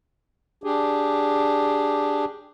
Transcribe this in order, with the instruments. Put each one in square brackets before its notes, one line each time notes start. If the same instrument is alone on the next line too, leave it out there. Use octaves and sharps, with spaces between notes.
[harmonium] D4 G4 G#4